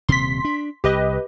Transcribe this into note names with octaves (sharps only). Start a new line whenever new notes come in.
D#1 C3 C6 B6
D4
C2 G4 B4 D#5